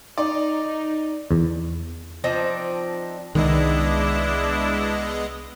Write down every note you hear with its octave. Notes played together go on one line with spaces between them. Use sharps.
D#4 D5
E2
F3 C4 D4 D#4
C2 D#3 G#3 B3 D4 E4 D#5